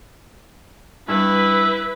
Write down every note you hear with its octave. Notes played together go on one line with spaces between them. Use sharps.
G2 E4 B4